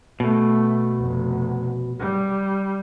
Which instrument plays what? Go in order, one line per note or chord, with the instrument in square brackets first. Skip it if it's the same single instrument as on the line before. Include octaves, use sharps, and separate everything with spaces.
[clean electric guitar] B2 [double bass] A3
[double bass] F1
G3